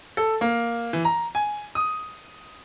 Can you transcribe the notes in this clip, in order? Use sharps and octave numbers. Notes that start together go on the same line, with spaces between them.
A4
A#3
E3
A#5
G#5
D#6